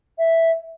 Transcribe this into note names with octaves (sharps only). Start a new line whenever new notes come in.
E5